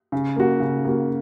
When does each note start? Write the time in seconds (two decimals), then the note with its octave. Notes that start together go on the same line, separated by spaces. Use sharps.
0.12 C#3
0.36 A#3 F#4
0.60 C#3
0.85 A#3 F#4